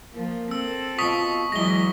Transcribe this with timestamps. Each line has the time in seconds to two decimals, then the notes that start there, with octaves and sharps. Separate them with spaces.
0.14 F3 A#3
0.51 C4 A4 E6
0.98 B2 F4 C#6 D#6 B6
1.52 E2 E3 F#3 G#3 D#5 A#6 G7